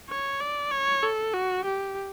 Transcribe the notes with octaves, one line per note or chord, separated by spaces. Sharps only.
C#5
D5
C#5
A4
F#4
G4